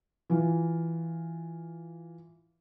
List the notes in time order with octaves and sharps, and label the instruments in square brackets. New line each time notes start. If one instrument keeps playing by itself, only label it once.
[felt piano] E3 F4